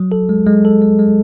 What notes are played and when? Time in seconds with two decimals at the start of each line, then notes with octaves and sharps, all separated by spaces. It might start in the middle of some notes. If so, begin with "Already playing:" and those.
Already playing: F#3
0.12 A4
0.29 G#3
0.46 G#3
0.65 A4
0.82 G#3
0.99 G#3